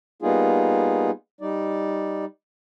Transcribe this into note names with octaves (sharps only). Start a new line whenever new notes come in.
G3 A#3 B3 D#4 F4 G#4
G3 D#4 D5